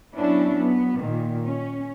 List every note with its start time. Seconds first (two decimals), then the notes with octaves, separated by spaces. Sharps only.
0.14 F#3 B3 C#4 D4 E4
0.56 F#3 B3
1.00 A#2 D#3
1.45 C#4